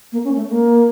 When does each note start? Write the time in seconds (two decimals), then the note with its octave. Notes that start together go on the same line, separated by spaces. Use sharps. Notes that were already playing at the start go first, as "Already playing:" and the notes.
0.12 A#3
0.24 C#4
0.36 A3
0.49 A#3